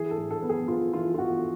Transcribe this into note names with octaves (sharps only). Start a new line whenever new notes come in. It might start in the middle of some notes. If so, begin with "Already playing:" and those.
Already playing: E3 G#4
A4
A2
A4
B3
G#4
B3 F4
E3 F4
F4
E3 F#4